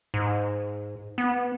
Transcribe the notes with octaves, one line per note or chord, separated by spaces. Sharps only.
G#2
B3